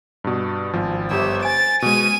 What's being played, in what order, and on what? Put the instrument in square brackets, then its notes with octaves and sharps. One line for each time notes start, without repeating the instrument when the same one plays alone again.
[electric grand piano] G2 B2
G#1 F3
[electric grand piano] G1 G4 [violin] C5 E5
[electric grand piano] G#5 D7 [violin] A6
[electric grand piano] B2 G#3 [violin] G#5 D#7